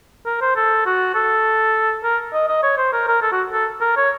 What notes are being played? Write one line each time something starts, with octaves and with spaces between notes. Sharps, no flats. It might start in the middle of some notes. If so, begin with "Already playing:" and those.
A#4
C5
A4
F#4
A4
A#4
D#5
D#5
C#5
C5
A#4
A#4
A4
F#4
A4
A#4
C#5